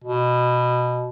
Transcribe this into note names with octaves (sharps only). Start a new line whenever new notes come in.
B2